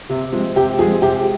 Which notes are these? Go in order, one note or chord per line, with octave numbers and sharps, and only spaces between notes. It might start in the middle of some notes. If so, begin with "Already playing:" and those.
C3
F3 G#3 C4
C3 G4
F3 G#3 C4 G#4
C3 G4